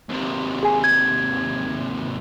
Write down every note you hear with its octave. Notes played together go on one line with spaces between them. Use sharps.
D#2 C3
G#4 G#5
G#6